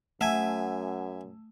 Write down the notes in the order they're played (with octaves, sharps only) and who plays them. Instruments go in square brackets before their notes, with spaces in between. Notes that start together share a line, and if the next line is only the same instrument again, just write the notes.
[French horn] F#2 [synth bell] A3 [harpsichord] E5 G#5 [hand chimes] F#5